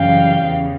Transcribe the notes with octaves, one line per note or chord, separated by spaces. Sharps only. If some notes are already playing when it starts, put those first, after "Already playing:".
Already playing: F#2 C#3 E3 G3 F5 G5
E2 C#3 E3